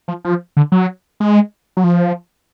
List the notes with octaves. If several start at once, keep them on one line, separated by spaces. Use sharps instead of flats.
F3
F3
D3
F#3
G#3
F#3
F3